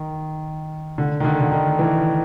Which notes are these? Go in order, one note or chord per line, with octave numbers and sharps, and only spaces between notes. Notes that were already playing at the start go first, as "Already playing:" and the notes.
Already playing: D#3
D3
D#3
D3
D3
D#3
E3